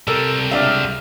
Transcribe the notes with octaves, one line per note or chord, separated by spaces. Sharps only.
C3 G3 A4 A#4
C#2 D4 D5 E5 F5